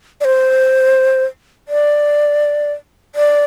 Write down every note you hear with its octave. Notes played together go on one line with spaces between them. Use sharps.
D5
C5
D5
D5